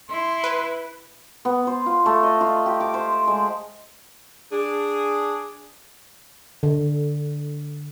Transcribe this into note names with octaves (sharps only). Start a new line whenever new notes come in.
E4 C6
B4
B3
C5
F4
A3
D#5
F4
G4
D6
C5
G#3
D4 G#4
D3